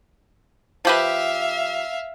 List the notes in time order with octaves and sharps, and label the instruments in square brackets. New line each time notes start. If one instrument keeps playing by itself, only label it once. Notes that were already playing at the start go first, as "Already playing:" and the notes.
[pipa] F3 G4 B4 [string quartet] E5 F5